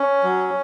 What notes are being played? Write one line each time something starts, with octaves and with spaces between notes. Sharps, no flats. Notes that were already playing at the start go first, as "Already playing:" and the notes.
Already playing: C#4
F#3